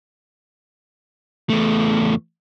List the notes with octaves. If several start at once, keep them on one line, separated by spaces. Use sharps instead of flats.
E2 A3